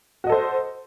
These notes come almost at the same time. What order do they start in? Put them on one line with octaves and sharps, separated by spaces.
F#4 D#5 A4 C5